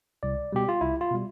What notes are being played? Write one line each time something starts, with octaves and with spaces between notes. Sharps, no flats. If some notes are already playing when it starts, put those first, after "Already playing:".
C2 D5
B2 G3 G4
F4
C2 E4
F4
B2 G3